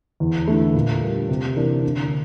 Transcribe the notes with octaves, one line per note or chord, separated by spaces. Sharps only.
E2
D3 A3 E4
A#2
G3 A#3
C3
E3 A#3 D4
D3